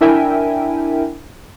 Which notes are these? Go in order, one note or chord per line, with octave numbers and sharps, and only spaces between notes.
D4 E4 A#4 E5 G5 G#5